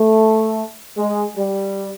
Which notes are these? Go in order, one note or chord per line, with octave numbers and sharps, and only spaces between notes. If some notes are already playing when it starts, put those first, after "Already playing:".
Already playing: A3
G#3
G3